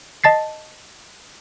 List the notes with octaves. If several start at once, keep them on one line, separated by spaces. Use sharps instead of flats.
D#5 A5 A6 C7